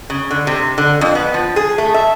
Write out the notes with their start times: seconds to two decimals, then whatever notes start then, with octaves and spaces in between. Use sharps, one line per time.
0.10 C#3
0.31 D3
0.47 C3
0.78 D3
1.01 F2
1.15 B3
1.34 F3
1.56 G#4
1.78 A3
1.94 E5